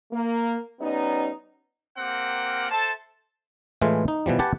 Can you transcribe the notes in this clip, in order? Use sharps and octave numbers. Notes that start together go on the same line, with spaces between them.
A#3
G3 B3 C#4 D#4
A#3 C4 G4 A#4 F#5 G5
A4 C5 E5 A5
A2 E3 G#3 A3 F4
D#4
B2 E3 F3 G3
G4 B4 F#5 G#5 A5